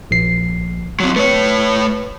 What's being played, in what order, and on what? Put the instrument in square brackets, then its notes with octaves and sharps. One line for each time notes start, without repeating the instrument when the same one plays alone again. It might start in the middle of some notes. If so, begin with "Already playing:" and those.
[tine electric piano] A#1 C7
[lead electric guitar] F#3 C4
[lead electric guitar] A3 C#5 [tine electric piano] B4